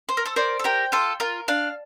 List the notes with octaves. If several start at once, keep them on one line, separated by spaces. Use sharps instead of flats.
C5 C6
A#4
A4 C5
A#4 C5 D5
A4
G4 A#4 G5
F4 A4 C6
F4 A#4
D4 F5